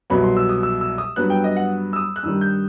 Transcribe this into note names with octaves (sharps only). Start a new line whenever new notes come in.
C2 B2 F#3 B3 B5
C6
E6
D#6
E6
E6
D#6
G2 F#3 B3 F#6
G5
D#5
F#5
E6
D#6
F#6
G2 D#3 G3 E6
G6